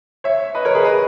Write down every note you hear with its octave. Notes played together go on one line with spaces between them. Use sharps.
C#5 E5
B4 D#5
A#4 C#5
G#4 B4
B4 D#5